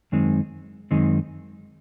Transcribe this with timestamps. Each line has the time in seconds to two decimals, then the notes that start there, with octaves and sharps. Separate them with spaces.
0.12 F#2 D#3 G#3 C4 D#4
0.91 F#2 D#3 G#3 C4 D#4